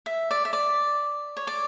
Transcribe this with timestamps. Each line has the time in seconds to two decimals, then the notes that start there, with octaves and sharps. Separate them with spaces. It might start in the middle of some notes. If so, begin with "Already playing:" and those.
0.06 E5
0.31 D5
0.45 E5
0.53 D5
1.37 C#5
1.47 D5